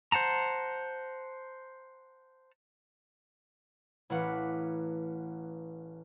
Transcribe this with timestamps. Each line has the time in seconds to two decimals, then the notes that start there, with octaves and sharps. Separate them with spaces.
0.12 C5 F#5 A5 A#5
4.10 A1 E3 B4 F5 F#5 D6